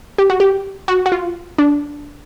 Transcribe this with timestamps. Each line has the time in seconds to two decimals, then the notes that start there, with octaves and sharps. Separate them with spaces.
0.18 G4
0.30 F#4
0.40 G4
0.88 F#4
1.06 F#4
1.12 F4
1.58 D4